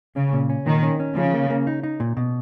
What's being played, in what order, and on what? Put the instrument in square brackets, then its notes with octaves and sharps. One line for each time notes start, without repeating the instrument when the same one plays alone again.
[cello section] C#3 [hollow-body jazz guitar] C#4
[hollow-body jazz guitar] A#2
C#4
[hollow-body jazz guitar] A#2 [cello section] D#3
[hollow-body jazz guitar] C#4
C#4
[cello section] C#3 [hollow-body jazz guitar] F3
[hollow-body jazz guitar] A#3
A#3
D#4
D#4
A#2
B2